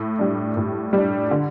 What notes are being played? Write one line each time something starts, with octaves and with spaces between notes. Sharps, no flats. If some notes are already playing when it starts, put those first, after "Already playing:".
Already playing: A2
G3 D4
A2
G3 D4
D3